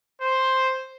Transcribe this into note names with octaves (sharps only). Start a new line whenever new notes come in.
C5